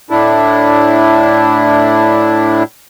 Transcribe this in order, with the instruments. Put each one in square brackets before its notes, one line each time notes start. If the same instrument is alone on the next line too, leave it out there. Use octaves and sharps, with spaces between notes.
[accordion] A2 D4 E4